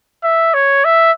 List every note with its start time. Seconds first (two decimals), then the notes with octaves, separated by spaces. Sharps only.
0.23 E5
0.54 C#5
0.84 E5